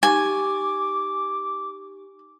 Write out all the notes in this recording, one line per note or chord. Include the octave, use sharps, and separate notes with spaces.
D#4 G4 G#5 C#6 D6